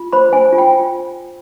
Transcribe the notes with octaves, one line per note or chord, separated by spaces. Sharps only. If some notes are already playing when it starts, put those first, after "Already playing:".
Already playing: F4
C5 B5
C5 G#5
F4
G5